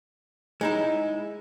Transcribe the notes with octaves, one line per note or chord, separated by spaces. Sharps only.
G#3 D#4 E4